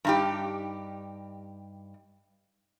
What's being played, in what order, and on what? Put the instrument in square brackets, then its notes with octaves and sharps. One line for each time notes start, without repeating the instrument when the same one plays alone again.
[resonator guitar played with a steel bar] G2 D#4 G4